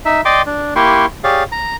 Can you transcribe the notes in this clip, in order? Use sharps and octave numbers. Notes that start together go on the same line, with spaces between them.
D#4 E5
D5 D#5 G5 C6 D6
D4
A#3 E4 G4 G5 C6 C#6
G4 G#4 C#5 D5 F5
A#5